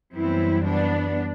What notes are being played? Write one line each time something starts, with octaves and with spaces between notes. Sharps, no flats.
F#2 E3 G3 B3 C4 E4
B3 D4